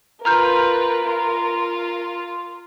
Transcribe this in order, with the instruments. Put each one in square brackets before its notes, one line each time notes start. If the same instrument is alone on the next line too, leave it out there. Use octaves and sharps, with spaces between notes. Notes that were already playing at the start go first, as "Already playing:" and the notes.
[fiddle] F4 B4 [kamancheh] A#4 [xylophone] A#5 F6 G6
[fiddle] F4